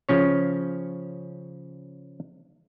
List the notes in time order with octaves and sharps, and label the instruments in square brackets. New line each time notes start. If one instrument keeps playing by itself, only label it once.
[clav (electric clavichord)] C#3 F3 C#4 C#5